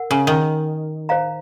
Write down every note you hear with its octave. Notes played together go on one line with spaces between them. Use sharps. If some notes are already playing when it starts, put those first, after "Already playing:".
Already playing: A#4 F#5
C#3
D#3
C5 F5 A#5